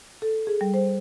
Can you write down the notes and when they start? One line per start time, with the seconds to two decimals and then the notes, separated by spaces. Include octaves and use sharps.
0.22 A4
0.47 G#4
0.61 G3
0.74 C5